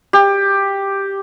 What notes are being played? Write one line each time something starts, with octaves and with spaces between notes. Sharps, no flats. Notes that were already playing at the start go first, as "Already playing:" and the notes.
G4